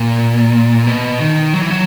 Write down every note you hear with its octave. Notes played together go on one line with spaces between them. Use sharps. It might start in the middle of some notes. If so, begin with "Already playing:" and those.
Already playing: A#2
B2
D#3
F#3
E3
F#3